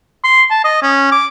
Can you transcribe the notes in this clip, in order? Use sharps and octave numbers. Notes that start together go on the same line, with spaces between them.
C6
A5
D#5
C#4
D6